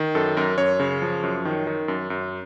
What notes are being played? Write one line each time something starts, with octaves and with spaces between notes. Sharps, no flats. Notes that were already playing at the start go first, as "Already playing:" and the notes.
Already playing: D#3
F#2 A4
F#2 A#4
F#2 C#5
C#3
F3
F#2
D#3
D#3
F#2
F#2